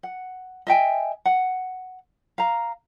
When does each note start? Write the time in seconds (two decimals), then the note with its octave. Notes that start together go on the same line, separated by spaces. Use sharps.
0.03 F#5
0.67 D#5 E5 G5 G#5
1.25 F#5
2.38 F5 A#5